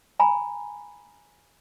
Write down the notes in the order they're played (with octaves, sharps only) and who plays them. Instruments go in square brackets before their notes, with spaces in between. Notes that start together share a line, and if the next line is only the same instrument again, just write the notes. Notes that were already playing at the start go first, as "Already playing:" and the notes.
[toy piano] G#5 A#5 B5